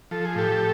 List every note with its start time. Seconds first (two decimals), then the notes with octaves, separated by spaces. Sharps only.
0.11 F3 A4
0.25 G#4
0.35 A2 G4 A4